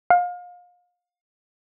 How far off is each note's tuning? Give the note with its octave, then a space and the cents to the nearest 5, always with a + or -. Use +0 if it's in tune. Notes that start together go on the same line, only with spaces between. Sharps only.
F5 +30